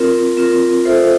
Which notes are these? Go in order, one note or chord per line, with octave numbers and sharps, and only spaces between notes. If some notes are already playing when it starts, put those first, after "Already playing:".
Already playing: C4 F4 A#4
C4 F4 A#4
F4 A4 C5 E5